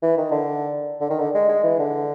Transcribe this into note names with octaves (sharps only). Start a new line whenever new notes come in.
E3
D#3
D3
D3
D#3
D3
G#3
G#3
E3
D3